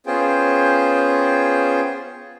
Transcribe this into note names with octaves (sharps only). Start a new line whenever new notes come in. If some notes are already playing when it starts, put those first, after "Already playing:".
B3 C#4 F4 G#4 C5 G5